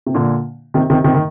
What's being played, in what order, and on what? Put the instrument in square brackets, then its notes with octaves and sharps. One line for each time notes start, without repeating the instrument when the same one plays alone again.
[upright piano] C3
A#2 D3
C3 D#3
C3 D#3
C3 D#3
D#3